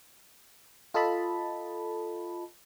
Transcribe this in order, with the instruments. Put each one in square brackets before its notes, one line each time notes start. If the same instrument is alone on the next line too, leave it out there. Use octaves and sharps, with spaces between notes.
[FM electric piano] F4 A4 D#5 A5 B5